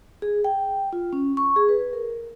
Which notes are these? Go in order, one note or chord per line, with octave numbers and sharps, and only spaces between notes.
G#4
G5
F4
C#4
C#6
G#4
B4
A#4